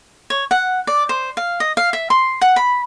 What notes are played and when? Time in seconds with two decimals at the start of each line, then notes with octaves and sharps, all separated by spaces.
0.30 C#5
0.51 F#5
0.87 D5
1.09 C5
1.37 F5
1.60 D#5
1.77 F5
1.93 E5
2.10 C6
2.41 F#5
2.56 B5